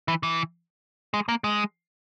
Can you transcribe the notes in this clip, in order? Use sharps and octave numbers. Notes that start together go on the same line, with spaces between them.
E3
E3
G#3
A#3
G#3